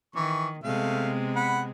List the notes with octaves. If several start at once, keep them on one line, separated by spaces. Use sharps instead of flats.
D#3 E3 C#6
C3 G#3 A3 B3 F5
F#5 B5